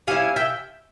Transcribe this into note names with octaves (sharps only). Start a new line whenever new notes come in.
G3 C#4 E4 F5 G#5
E5 G5